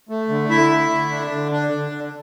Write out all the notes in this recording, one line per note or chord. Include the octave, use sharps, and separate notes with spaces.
A3
D3
D3 E4 E5
A3
D3
D4
D3
D4
D3
D3